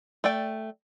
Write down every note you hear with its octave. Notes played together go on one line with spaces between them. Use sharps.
A3 D5 G5